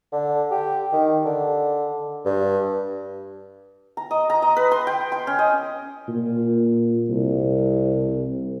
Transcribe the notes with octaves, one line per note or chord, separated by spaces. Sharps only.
D3
G4
D#3
D3
G2
A#5
D#5
A#5
D#5
B4
C6
G5
C6
C#4
D#5
A#2
C2